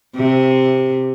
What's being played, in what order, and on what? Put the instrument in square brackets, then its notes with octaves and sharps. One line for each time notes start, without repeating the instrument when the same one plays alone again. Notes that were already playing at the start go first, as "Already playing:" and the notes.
[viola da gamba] C3